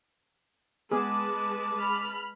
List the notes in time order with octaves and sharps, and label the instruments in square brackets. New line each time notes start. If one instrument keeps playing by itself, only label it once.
[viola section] G#3 B4 A5 [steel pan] B3 G#4 [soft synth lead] D6
[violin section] B5 F6